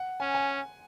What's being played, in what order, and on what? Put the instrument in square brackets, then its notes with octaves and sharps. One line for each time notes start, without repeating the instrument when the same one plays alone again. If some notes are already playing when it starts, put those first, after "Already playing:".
Already playing: [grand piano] F#5
[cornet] C#4 [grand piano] G#5
[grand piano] G#5